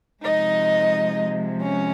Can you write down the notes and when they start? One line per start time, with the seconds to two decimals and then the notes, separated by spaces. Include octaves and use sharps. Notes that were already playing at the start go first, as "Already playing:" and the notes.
0.23 C3 F3 G#3 D#4 D#5
1.62 C#4 C#5